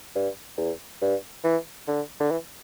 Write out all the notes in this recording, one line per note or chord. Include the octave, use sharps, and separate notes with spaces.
G2
E2
G2
E3
D3
D3
E3